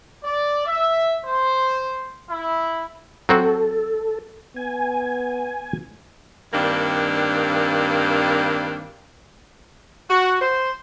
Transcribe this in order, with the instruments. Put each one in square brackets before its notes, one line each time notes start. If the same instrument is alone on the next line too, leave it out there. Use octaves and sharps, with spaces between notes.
[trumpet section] D5
E5
C5
E4
[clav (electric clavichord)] F#3 C4 F#4 [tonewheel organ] A4
[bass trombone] B3 [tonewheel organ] G#5
[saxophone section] G2 D#3 A#3 C4 D4
[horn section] F#4
C5